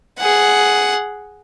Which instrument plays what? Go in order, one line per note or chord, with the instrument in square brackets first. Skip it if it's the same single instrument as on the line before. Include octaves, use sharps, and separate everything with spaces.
[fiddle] G#4 F#5